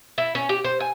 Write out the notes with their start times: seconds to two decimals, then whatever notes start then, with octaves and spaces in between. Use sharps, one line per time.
0.18 E4
0.35 C#4
0.49 G4
0.64 C5
0.80 G#5